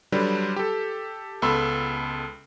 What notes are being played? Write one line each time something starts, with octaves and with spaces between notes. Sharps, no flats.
D3 F#3 G3 D4 B4
G4 A4
C#2 B3 A4 B5 C6 E6